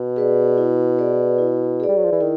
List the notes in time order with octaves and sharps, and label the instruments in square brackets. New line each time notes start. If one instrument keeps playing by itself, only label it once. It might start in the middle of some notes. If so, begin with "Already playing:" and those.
Already playing: [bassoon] B2
[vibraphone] G#4 B4 D5
E4
G#4 B4 D5
E4
G#4 B4 D5
[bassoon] G3
F#3
F3
E3
[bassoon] D#3 [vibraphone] E4